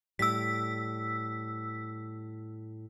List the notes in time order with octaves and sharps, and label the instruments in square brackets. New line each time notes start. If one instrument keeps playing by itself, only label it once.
[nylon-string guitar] A2 G3 [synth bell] E6 B6